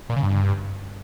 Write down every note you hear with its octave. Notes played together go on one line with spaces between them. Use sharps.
A#2
C#3
G2